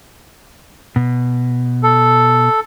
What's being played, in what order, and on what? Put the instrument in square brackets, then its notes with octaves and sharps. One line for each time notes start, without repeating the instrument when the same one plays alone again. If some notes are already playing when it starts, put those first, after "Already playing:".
[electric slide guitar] B2
[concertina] A4